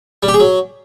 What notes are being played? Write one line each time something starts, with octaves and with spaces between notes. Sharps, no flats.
G3
G4
G#4
F#3